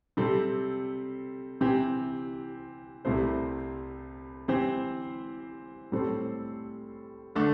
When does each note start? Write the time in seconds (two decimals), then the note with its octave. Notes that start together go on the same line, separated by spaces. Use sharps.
0.17 C3 G3 C4 A4
1.61 C3 E3 C4 G4
3.05 C2 C3 A3 E4 C5
4.48 E3 C4 G4 C5
5.92 A2 G3 C4 A4 C5
7.36 D3 A3 D4